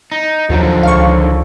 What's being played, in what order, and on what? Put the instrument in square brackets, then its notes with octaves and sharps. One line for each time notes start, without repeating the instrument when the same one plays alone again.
[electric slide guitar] D#4
[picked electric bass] D#2 F#3 [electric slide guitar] D3 D#3 [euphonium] F3
[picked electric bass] C#2 [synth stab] F5 C#6